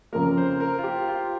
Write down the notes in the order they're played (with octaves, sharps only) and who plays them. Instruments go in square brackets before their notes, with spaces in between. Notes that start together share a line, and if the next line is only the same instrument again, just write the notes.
[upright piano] F2 C#3 F3 A#3 [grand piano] A#4
[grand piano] C5
A#4
F4
G4
F4